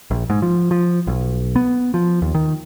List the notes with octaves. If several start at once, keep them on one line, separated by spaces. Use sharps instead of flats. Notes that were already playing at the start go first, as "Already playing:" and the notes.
A#1
G#2
F3
F3
B1
B3
F3
D#2
D#3